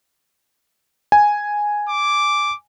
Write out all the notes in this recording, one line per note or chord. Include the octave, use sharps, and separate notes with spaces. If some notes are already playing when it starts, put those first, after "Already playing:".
G#5
D6